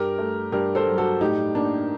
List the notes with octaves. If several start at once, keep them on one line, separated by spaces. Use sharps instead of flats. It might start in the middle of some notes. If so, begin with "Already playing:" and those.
Already playing: G2 G4 A#4
A3
G2 G4 A#4
A4 C5
F#3
F#4 A4
A2 D#4 G4
A#3 D4